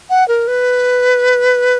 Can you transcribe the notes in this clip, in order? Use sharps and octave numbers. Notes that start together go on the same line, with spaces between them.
F#5
A#4
B4